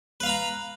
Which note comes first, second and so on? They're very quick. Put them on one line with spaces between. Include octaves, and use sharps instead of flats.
B4 F5 B5 A#5